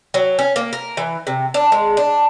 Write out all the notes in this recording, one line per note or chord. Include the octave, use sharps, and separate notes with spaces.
F#3
C#4
A#3
A#4
E3
C3
D4
G#3
D4